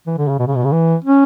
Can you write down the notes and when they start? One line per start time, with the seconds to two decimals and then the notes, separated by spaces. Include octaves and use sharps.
0.07 E3
0.18 D3
0.28 C#3
0.39 B2
0.47 C#3
0.55 B2
0.64 C#3
0.72 E3
1.04 C#4